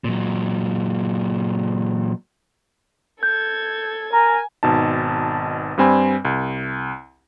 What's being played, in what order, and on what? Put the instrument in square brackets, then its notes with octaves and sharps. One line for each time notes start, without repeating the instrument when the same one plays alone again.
[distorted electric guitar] A#2 F#3
[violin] A4 G#6 [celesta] G6
[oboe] A#4 [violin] G#5 [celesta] A#5
[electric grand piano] G#1 B2 D#4 A5
G2 G3 C4 G#5 B5
C2